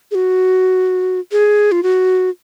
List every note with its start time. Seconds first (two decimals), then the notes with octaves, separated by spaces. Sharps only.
0.11 G#4
0.15 F#4
1.32 G#4
1.72 F4
1.83 F#4